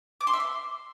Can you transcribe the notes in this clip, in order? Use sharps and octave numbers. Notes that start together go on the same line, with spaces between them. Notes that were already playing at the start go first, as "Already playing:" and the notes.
D6
C6
E5
C6